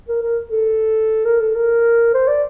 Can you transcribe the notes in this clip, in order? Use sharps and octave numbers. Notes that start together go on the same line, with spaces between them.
A#4
A#4
A4
A#4
A4
A#4
C5
D5